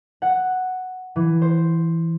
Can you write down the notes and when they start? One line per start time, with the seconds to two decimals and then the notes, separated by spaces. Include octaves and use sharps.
0.22 F#5
1.16 E3
1.42 C5